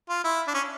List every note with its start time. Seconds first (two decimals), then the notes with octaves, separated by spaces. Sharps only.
0.09 F4
0.24 E4
0.47 D4
0.54 C#4